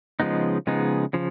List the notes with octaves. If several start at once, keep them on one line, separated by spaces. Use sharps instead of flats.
C#3 F3 G#3 B3 D#4
C#3 F3 G#3 B3 D#4
C#3 F3